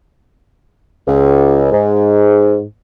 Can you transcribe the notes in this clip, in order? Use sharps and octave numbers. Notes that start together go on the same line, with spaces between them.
C#2
G#2